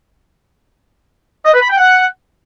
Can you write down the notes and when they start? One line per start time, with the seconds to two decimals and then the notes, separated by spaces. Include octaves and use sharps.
1.46 D#5
1.54 B4
1.62 B5
1.70 G5
1.78 F#5